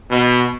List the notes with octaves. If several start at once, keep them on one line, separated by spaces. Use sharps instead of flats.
B2